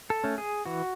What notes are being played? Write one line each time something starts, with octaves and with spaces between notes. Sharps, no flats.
A4
A3 C#4
G#4
E3 F#4